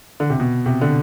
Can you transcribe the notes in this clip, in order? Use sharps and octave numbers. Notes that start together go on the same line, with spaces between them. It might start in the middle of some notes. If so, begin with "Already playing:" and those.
D3
C3
B2
C3
D3